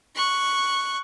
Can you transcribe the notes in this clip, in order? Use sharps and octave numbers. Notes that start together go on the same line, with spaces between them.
C#6 F#6